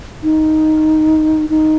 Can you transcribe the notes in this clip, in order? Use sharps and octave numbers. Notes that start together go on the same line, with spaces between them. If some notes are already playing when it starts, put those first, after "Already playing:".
D#4
D#4